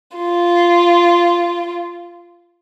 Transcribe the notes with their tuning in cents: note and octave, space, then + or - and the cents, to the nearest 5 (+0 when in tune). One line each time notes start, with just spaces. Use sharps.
F4 -10